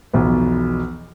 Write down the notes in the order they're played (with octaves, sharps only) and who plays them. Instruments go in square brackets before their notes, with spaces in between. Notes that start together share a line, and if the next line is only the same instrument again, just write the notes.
[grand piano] B1 E2 B2 F3 B3